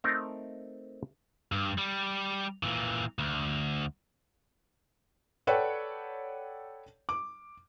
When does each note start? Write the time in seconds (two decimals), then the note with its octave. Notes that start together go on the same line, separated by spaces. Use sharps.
0.04 A3 C4 D#4 A#4
1.52 G2
1.78 G3
2.63 A#2 E3
3.19 D2
5.47 A4 B4 C#5 D5 F#5 G5
7.09 D6